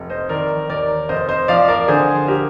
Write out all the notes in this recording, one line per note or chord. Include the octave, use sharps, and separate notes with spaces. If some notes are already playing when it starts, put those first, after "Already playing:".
Already playing: F1
C5 D#5
D#3 A#4 D5
D#2 A#4 D5
F1 C5 D#5
C5 D#5
F3 D5 F5
A#4 D5
D3 G#4 C5
G4 A#4